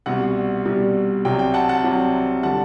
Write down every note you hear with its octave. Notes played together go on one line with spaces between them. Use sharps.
C2 B2 G3 F#5
C2 B2 G3
C2 C3 F#3 G5
G5
F#5 A5
F#5 A5
C2 C3 F#3
D3 G3 F#5 A5